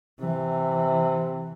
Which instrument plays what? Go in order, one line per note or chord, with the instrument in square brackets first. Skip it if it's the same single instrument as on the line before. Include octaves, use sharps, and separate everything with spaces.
[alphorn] C3 [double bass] E3